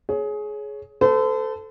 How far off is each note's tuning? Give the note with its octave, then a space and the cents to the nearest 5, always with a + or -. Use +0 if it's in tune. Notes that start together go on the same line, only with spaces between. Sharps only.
G#4 +20 C#5 +0
A4 +0 C5 -40